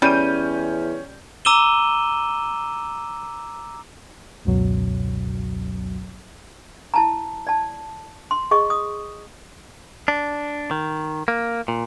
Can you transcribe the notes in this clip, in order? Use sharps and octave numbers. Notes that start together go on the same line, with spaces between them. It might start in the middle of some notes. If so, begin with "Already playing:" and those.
E2 G3 C#4 G6 D#7
A#5 D6 E6 D#7 E7 G7
G#1 C#2 F#2 B2 F#3
E4 A5 A#5
D5 A5
C6
G#4 D#5 C#6
D#6
D4
D#3
A#3
A#2